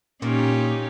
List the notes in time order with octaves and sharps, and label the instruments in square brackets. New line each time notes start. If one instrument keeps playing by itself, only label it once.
[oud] A#2 [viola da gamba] C#4 D#4 G4